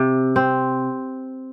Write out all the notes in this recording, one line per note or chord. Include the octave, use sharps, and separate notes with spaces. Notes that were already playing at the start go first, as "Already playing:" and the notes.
Already playing: C3
C4